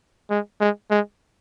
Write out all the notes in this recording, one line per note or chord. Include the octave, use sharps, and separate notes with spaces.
G#3
G#3
G#3